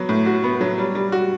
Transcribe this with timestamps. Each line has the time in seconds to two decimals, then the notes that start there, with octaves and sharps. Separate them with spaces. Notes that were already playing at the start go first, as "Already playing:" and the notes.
Already playing: F#3 B3 F#4
0.09 A2
0.26 F#4
0.44 B3
0.61 F#3
0.78 G3
0.95 G3
1.12 F#4